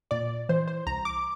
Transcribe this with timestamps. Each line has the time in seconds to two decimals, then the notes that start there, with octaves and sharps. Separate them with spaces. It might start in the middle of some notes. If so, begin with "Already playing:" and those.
0.11 A#2 D5
0.49 E3 C5
0.67 C5
0.86 C2 A#5
1.05 D6